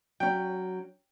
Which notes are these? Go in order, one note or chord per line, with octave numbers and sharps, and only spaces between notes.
F#3 C#4 G5